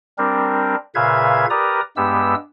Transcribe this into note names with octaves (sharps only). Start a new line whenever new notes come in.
G3 C4 D4 A#4
A#2 C#3 B4 E5 F5 G#6
G4 A#4 B4 D5 A#5 D#6
G2 G#3 B3 G4 E6